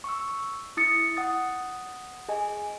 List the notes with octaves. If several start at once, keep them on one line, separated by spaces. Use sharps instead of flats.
C#6 E6
E4 D#6 A6 C#7
F#5 D#6 A6
G#4 D#5 G#5